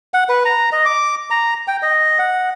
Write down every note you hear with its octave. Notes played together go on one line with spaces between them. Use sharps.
F#5
B4
A#5
D#5
D6
A#5
G5
D#5
F#5